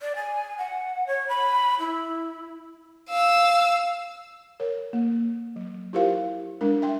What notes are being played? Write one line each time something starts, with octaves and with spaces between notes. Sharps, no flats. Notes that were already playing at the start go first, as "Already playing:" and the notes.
D5
G#5
F#5
C#5
B5
E4
F5 E6
A#4 C#5
A#3
F#3
E4 F4 G4 A#4 C5 F5
G3 G#3 D4 A#4
E5 G5 C6